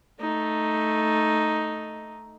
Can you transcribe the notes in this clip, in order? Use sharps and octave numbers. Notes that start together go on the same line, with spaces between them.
A3 D#4